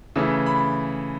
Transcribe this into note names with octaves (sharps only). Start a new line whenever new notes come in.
C#3 E3 A3
B5